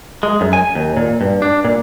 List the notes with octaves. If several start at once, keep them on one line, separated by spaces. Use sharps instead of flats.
G#3
F#2
G#5
D#2
A#2
G2
D4
A#2